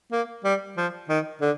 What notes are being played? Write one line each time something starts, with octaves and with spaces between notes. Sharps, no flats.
A#3
G3
F3
D#3
D3